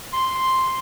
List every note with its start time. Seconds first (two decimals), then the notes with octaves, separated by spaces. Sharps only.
0.13 C6